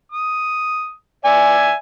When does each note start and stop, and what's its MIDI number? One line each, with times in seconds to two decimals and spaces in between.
0.12 0.93 87
1.25 1.74 74
1.25 1.74 76
1.25 1.74 80